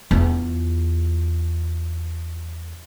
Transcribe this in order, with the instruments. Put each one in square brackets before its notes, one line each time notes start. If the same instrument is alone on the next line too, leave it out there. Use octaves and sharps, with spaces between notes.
[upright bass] E2 F4